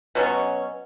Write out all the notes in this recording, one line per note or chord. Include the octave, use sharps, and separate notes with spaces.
B2 F#3 C#4